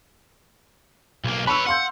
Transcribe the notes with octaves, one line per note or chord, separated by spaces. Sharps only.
B1 A#3
B4 C#5 B5 C#6 E6
F5 F#5 C6 G6